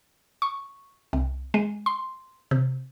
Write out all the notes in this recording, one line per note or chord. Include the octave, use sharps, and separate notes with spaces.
C#6
C2
G#3
C6
C3